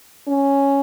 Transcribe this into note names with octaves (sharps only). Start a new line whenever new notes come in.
C#4